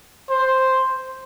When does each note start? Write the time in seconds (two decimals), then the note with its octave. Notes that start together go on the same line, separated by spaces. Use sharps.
0.30 C5